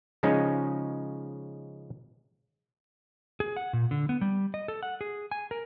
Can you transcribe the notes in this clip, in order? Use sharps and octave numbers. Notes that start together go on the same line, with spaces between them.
C#3 F3 G#3 C#4 D#4
G#4
F#5
A#2
D3
B3
G3
D#5
A4
F#5
G#4
G#5
A#4